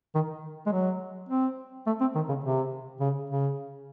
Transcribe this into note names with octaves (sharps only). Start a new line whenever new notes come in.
D#3
G#3
F#3
C4
A3
C4
D#3
C#3
C3
C#3
C#3